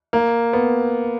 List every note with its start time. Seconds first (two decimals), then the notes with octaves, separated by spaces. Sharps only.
0.13 A#3
0.53 B3